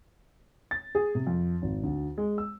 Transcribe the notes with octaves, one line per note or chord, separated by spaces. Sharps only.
A6
G#4
C3
F2
G#1
D2
G#3
E6